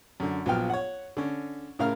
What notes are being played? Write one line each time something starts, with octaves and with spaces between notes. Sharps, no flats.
F#2 D3
A#1 F#3 B3 F4 G5 F6
C#5 F#5
D3 C#4
A2 C#3 A#4 F5 F6